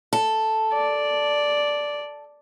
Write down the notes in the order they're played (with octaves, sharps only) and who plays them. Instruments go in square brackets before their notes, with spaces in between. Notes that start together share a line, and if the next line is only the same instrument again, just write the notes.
[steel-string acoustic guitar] A4
[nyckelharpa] D5